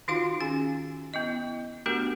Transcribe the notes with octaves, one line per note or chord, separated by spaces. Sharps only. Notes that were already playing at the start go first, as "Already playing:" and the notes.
D#3 D#4 F4 F#4 F5 C6
C#4 G#4 G#5
B3 E4 D#5
A3 B3 D4 F#4 G4 A#4